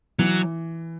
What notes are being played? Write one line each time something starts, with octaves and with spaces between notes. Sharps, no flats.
E3 F#3